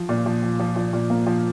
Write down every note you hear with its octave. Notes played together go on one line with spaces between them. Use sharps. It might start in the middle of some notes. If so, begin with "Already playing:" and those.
Already playing: F3
A#2
F3
F3
F3
F3
A#2
A#3
F3